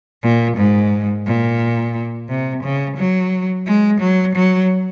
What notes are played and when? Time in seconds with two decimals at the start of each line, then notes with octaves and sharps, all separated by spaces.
0.23 A#2
0.57 G#2
1.26 A#2
2.29 C3
2.63 C#3
2.97 F#3
3.66 G#3
4.00 F#3
4.35 F#3